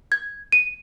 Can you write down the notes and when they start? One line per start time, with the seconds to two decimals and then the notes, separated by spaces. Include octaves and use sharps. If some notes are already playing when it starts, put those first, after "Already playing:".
0.12 G#6
0.52 D#7